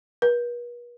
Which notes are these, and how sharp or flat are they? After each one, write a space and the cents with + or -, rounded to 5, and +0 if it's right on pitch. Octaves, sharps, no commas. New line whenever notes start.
B4 -45